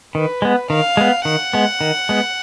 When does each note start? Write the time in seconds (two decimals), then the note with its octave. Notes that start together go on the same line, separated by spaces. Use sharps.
0.14 D#3 B4
0.42 G#3 B3
0.70 D#3 F5
0.97 G#3 B3
1.25 D#3 F#5
1.53 G#3 B3
1.81 D#3
2.09 G#3 B3